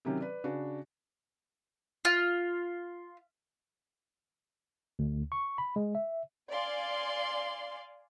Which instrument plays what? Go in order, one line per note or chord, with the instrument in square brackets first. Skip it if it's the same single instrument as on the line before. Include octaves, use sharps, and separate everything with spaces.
[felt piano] C3 D#3 F#3 C#4 G4
B4 D5
C#3 D4 F#4
[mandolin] F4
[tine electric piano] D2
C#6
B5
G#3
E5
[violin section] D5 F5 G#5 C6